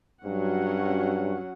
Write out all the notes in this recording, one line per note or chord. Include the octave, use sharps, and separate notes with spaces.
G2 F#3 C#4 F#5